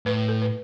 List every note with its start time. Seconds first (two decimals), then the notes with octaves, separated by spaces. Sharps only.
0.06 A2 B4
0.28 A4
0.42 B4